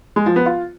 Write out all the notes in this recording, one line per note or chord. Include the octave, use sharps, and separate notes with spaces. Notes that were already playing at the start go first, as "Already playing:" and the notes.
G#3
F3
B3
F4